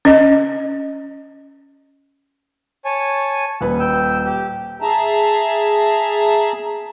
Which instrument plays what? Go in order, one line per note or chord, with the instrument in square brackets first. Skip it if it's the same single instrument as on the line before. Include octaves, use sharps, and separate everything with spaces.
[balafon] C#4 D#5
[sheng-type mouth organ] C#5 G#5 A5
[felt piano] D#1 B4
[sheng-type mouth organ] G5 E6
G4
[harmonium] G#4 E5 A5 A#5